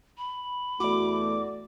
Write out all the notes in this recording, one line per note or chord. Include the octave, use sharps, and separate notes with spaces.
B5
E2 E3 A3 F#4 D5 D6